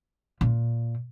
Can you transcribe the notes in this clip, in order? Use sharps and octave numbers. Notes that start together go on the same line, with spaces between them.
A#2